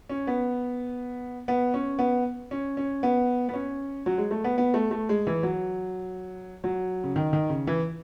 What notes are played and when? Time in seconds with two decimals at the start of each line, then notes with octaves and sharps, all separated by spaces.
0.09 C#4
0.27 B3
1.48 B3
1.74 C#4
1.99 B3
2.51 C#4
2.77 C#4
3.03 B3
3.49 B3
3.54 C#4
4.06 F#3
4.18 G#3
4.31 A3
4.44 B3
4.58 B3
4.74 A3
4.91 A3
5.09 G#3
5.27 E3
5.43 F#3
6.64 F#3
7.04 C#3
7.16 D#3
7.33 D#3
7.49 C#3
7.67 E3